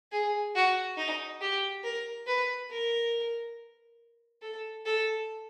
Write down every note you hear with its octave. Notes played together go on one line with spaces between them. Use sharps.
G#4
F#4
D#4
G4
A#4
B4
A#4
A4
A4